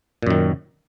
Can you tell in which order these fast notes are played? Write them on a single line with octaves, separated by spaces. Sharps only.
A#2 F#2 D#3